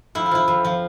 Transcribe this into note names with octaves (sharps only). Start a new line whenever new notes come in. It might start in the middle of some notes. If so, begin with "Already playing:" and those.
F2 E4
F4
F3 E4
F2
F3